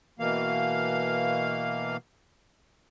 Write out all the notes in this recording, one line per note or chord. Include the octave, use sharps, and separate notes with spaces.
B2 E3 A#3 F5